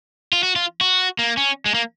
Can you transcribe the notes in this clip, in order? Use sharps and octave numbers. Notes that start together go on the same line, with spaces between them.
F4
F#4
F4
F#4
A#3
C#4
G#3
A#3